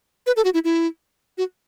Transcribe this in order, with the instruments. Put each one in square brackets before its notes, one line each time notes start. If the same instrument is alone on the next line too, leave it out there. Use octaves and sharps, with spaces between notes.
[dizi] B4
A4
F#4
E4
E4
F#4